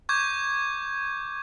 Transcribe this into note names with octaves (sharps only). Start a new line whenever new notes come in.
C#6 D6 G6 G#6